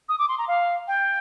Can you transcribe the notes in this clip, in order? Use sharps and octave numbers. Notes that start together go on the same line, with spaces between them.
D#6
D6
C6
A#5
F5
G5